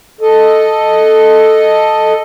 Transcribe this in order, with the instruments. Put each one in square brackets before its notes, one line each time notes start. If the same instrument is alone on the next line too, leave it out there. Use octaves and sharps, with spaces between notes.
[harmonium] A4 D#5